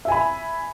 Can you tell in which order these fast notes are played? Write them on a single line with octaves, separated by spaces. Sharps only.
E5 G#5 B5